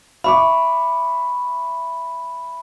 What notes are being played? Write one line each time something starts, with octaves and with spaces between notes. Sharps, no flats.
E5 B5 C#6 D6